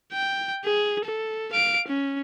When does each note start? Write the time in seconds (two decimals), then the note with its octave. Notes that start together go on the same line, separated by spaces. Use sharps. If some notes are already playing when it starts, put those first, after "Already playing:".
0.12 G5
0.64 G#4
1.05 A4
1.53 F5 D7
1.88 C#4